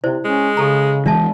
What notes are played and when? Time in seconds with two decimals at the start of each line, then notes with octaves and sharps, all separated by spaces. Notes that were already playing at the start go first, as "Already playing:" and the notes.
0.04 C3 E4 C5 D5
0.25 G#3 C#4
0.57 C#3 G4 A4 A#5
1.06 E3 G#3 D4 E5 A5